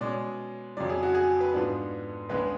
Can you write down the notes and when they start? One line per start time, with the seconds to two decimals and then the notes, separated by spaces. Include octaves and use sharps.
0.01 B2 G#3 C#4 D5
0.77 F2 C#3 F#3 D5
0.89 G#4
1.03 F#4
1.15 G#4
1.40 B4
1.54 G#2 F3 B3 D4
2.29 C#2 C#3 G#3 B3 D4 B4